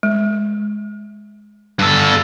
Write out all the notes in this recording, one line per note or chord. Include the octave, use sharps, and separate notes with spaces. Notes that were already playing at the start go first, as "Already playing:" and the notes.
G#3
G2 A4